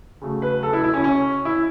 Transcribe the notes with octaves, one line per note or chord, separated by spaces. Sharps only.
C#3 F#3 A3
B4
A4
E4
E4
C#4
C#4
E4